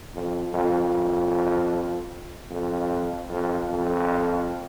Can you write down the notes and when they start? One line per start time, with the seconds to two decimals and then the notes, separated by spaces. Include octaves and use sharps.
0.15 F2
0.54 F2
2.51 F2
3.30 F2
3.69 F2